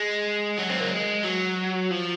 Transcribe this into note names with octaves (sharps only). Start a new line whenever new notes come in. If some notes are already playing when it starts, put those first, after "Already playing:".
Already playing: G#3
F#3
C4
A#3
G#3
F#3
F3